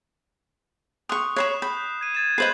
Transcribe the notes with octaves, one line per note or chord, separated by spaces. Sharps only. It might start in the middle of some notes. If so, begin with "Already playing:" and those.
C6 C#6 D#6 F#6
C#5 B5 C#6 F#6 C7 E7
B5 G6
G#6 D#7
G#6 A6 E7
B4 C5 D#5 C7 F#7